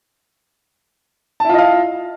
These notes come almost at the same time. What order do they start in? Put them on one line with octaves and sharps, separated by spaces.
A5 E4 F4 D#5 F5